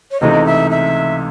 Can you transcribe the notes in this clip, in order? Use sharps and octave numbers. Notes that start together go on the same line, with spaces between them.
C#5
C#2 C3 E3 A3 D#4 D#5
E5
E5